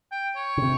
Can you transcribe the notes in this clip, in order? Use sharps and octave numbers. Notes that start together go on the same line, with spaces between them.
G5
C#5
C#3
C3